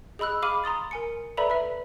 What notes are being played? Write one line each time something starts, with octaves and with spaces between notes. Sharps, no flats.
G#4 D#5 B5 E6 F#6
G#4 F5 B5 D6 F6 D#7
A#5 C6 D#6 A6
A#4 G#5 C#7
A4 B4 D5 E5 A#5 B5
B4 E5